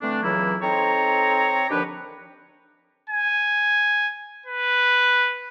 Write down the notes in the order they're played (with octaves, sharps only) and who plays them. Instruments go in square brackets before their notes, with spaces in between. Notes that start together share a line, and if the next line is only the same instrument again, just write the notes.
[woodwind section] D3 E3 A3 C4 D4
C#2 C#3 E3 F#3 A#3 E4
C4 D#4 A4 C5 C#5 A#5
D#2 D3 F3 D4 G4 B4
[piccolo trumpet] G#5
B4